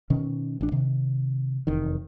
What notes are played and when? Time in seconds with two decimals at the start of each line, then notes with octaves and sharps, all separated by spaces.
0.10 B2 D#3 C#4
0.61 A1 D4
0.72 C3 D#3
1.67 F1 E2 D#3